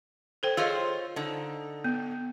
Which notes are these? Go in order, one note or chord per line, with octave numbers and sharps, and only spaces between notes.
A4 C5 G5
F4 G#4 C5 C#5 D#5
D3 D#4
B3